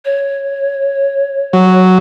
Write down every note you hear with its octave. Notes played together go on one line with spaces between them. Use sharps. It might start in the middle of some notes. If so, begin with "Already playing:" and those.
C#5
F#3